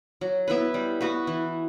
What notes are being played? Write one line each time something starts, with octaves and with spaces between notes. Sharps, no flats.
F#3
B3 E4 B4
G3
B3 F#4 B4
E3